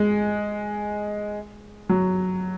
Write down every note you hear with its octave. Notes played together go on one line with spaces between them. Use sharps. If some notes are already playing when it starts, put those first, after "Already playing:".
Already playing: G#3
F#3